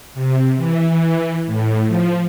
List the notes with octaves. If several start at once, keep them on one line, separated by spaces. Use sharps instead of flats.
C3
E3
E3
A2
F3